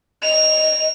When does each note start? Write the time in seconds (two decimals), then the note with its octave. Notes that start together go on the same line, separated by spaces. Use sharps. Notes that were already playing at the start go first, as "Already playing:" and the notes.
0.23 D#5 F7